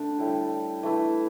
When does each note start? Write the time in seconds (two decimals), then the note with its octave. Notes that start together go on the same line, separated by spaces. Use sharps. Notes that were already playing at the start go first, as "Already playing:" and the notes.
Already playing: D3 A3 D4
0.18 A2 G3 E4 G4
0.83 E3 A3 E4